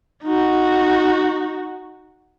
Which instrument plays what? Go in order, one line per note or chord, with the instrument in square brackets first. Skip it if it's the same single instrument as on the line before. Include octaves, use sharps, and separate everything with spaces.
[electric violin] D#4 F#4